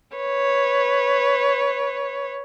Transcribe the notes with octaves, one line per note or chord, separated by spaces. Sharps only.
B4 C#5